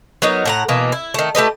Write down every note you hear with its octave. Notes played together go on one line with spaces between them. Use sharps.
F#3 B3 D#4 A#4
A2 F#5 A#5
B2 E3 A#3
E4
D#3 A3
A3 G4 B4 D#5